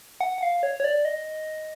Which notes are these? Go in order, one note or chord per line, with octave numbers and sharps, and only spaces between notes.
F#5
F#5
F5
C#5
C#5
D5
D#5